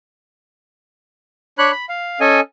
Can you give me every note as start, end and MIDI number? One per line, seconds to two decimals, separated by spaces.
1.58 1.71 62
1.58 1.71 73
1.58 1.71 83
1.58 1.71 90
1.72 1.86 83
1.89 2.20 77
2.20 2.40 61
2.20 2.40 69
2.20 2.40 75
2.20 2.40 80